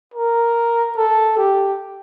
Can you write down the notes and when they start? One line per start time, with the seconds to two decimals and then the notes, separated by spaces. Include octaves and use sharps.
0.14 A#4
0.97 A4
1.37 G4